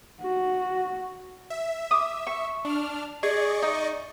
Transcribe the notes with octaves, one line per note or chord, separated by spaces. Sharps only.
F#4
E5
D6 D#6
C#6
D4 F6
G#4 D5 D#5 C#6
D#4